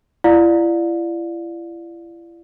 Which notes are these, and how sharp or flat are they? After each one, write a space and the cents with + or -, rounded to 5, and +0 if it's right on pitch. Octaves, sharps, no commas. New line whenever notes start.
E4 +40 D5 +10 F5 +35